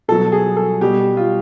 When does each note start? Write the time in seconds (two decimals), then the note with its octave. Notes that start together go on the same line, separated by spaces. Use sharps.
0.08 B2 F#3 A4
0.32 G#4
0.57 A4
0.81 B2 G3 G4
1.17 F4